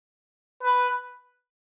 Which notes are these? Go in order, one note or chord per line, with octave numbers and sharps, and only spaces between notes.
B4